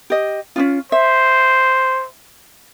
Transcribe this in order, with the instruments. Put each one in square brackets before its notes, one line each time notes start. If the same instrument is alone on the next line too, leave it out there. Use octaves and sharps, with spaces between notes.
[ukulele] G4 D#5
C#4 D4 F4
[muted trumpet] C5 [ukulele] E5